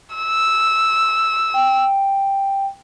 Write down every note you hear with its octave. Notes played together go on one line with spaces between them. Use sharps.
E6
G5